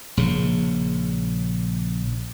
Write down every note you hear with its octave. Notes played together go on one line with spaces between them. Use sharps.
A#1 C#3